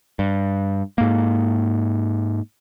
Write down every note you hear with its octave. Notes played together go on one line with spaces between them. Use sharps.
G2
G#2 A#3